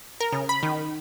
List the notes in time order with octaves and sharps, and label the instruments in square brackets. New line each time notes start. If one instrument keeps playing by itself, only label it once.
[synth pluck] A#4
C#3
B5
D#3